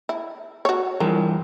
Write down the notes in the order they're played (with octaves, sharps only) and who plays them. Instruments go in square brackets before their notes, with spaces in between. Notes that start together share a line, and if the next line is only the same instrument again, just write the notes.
[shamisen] E4
F#4 C#5
[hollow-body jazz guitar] G2 E3 F3 [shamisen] A#4